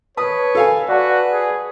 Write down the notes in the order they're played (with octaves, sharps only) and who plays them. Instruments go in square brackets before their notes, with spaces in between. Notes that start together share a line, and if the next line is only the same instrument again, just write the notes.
[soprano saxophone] B4 [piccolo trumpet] C#5 [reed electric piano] A5 [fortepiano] D#6
[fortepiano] A4 F5 G#5
[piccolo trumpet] F#4 [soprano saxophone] B4 [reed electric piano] D5 F#5 A5
[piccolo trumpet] G#4